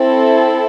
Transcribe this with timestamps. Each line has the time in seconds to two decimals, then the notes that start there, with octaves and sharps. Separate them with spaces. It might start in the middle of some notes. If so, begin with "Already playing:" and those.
Already playing: C4 E4 A4